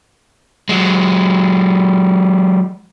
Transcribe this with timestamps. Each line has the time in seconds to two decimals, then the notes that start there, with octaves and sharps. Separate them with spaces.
0.69 F#3 G#3